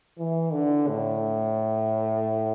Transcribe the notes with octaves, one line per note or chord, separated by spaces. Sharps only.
E3
D3
A2